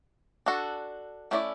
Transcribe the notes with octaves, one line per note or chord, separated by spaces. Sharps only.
D4 F#4 A4
A3 C#4 E4 G#4 D5